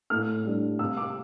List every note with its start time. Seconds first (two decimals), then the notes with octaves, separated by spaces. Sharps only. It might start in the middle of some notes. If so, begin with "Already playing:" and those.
0.10 A2 F6
0.45 G3 D4
0.79 C3 E6
0.97 D6